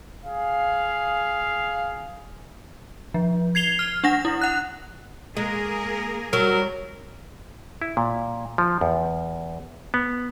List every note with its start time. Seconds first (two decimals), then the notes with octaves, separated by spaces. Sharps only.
0.24 G#4 F5
3.14 F3
3.55 G#6 C7 F7 G7
3.79 F6
4.04 D4 F#5 A#6
4.25 E4
4.41 F#5 F#6
5.37 G#3 A#3 G#4 A#4
6.33 F#3 G3 A#4 C#5 A#5
7.82 E4
7.97 A#2
8.58 F3
8.81 E2
9.94 B3